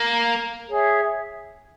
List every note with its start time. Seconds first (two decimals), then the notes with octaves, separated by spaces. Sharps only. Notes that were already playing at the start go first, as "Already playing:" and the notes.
Already playing: A#3
0.70 G#4 C#5 E5